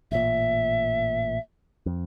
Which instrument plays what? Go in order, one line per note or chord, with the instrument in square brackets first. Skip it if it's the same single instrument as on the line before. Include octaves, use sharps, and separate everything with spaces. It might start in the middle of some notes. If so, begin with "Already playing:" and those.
[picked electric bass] A1 A#2 [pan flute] E5
[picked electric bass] F2